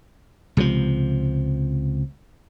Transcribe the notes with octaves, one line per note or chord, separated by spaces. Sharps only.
C#2 C3 D#3 F3